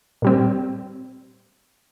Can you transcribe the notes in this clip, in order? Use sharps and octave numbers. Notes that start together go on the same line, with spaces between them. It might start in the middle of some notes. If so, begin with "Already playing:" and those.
A#2 G3 C4